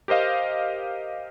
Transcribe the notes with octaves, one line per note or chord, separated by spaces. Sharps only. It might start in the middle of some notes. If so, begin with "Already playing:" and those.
G4 A#4 C5 D#5 F5